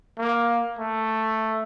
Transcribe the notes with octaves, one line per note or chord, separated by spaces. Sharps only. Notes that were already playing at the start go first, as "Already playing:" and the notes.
A#3
A3